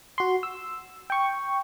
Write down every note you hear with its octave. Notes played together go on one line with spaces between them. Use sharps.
F#4 C6
E6
G5 C#6